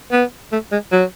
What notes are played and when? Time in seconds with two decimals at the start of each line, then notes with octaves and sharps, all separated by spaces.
0.12 B3
0.52 A3
0.72 G#3
0.92 F#3